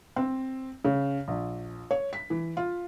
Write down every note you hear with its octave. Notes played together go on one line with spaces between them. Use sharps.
C4
C#3
A#1
C#5
B6
E3
F4